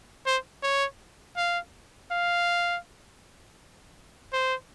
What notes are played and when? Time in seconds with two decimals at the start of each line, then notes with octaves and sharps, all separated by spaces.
0.26 C5
0.63 C#5
1.37 F5
2.11 F5
4.33 C5